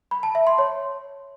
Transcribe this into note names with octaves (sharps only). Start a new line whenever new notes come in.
B5
A5
E5
C6
C#5